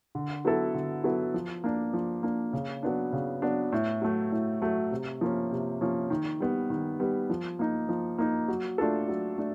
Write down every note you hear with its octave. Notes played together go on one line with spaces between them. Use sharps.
D3
F#3 B3 E4 A4
D3
F#3 B3 E4 A4
F3
A#3 D4
F3
A#3 D4
C#3
F#3 B3 D4
C#3
F#3 B3 D4
A2
F#3 A3
A2
F#3 A3
C3
F3 A#3 C#4
C3
F3 A#3 C#4
D#3
G3 B3
D#3
G3 B3
F3
A#3 D#4
F3
A#3 D#4
F#3
A3 D4 F4 A4
F#3
A3 D4